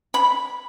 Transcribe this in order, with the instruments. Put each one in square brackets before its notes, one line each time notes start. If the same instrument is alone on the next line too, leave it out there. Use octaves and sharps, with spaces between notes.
[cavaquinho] B5